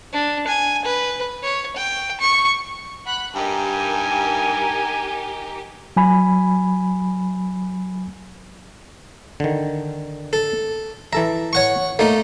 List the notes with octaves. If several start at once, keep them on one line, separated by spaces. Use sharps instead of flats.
D4
G#5
B4
C#5
G5
C#6
F#5 B5 F#6
G2 D#4 G4 A#4 G#5
F#3 G#5 B5
D3 D#3
A4
E3 A4 E5 A#5
C#5 F#5 C#6
A3 A#3 D#4